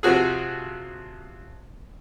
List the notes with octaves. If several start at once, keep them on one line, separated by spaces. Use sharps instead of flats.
C3 F3 F#4 G#4